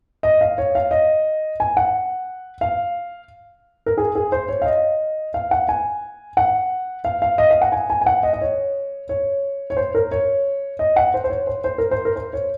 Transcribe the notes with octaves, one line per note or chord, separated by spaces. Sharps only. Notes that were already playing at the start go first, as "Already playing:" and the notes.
D#5
F5
C#5
F5
D#5
G#5
F#5
F5
A#4
G#4
G#4
C5
C#5
F5
D#5
F5
F#5
G#5
F#5
F5
F5
D#5
F5
F#5
G#5
G#5
G#5
F#5
D#5
D#5
C#5
C#5
C#5
C5
A#4
C#5
D#5
F#5
C5
C5
C#5
C5
C5
A#4
C5
A#4
C5
C#5